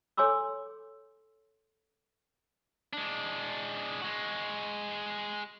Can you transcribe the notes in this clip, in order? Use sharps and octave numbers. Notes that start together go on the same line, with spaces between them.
A4 C#5 G#5 C6 D6 E6
G#3 D4
G#3 F#4